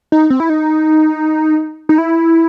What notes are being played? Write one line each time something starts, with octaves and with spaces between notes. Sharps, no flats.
D#4
C4
E4
D#4
D#4
E4